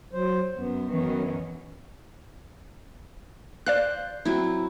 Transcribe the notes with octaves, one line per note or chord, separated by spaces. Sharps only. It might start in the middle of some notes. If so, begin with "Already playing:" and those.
F#3 C5
F#2 B3
F#2 D#3 E3 B3 C#4
C5 D5 F5 F#6
F#3 C4 E4